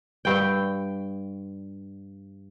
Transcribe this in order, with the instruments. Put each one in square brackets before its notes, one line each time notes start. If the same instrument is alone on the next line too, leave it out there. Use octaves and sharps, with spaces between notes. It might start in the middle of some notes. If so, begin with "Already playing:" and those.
[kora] G2 G5